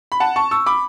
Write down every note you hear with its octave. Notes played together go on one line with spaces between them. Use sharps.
B5
F#5 A5
A5 C#6
C#6 E6
B5 D6